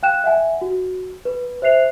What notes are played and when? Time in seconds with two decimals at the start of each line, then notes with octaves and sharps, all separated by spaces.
0.03 F5 G5 F#6 E7
0.24 E5 F#5 G#5
0.61 F#4
1.25 B4
1.62 C5 E5 F#6 C7 F7